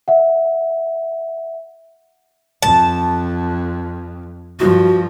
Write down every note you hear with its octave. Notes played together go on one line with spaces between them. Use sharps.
E5 F#5
F2 A5
G2 F3 F#4